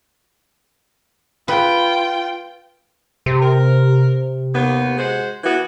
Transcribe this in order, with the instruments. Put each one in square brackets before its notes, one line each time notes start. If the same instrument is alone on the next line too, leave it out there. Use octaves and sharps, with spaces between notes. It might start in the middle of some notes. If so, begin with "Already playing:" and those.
[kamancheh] F4 G5 [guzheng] B4
[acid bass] C3
[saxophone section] A#4
D#2 B3
G#3 F#4 C5
E3 B3 F#4